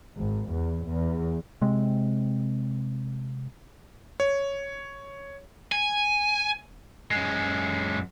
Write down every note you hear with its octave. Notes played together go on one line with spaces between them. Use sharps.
G#1
E2
E2
C3 G#3 C4
C#5
G#5
F#2 G#3